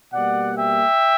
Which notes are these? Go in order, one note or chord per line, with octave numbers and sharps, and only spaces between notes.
B2 G3 A#3 D5 F#5
E5 G5